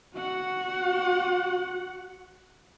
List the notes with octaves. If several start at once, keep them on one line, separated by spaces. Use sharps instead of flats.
F#4 F#5